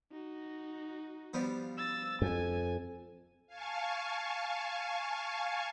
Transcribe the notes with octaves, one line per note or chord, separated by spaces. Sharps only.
D#4 F#4
F3 G3 B3
E6 A6
F2 G#5
F5 G#5 A5 C#6